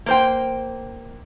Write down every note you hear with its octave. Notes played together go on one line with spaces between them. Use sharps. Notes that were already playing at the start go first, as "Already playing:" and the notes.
A#3 C5 G5